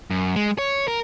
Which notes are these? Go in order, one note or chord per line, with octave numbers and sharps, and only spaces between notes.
F#2
G#3
C#5
A#4